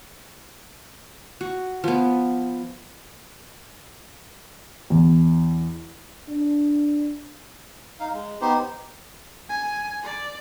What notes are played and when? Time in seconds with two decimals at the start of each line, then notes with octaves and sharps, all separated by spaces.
1.41 F#4
1.84 F3 B3
4.90 E2
6.28 D4
8.00 D#4 F5
8.13 G#3
8.41 B3 D#4 G4 C5
9.49 G#5
10.03 D5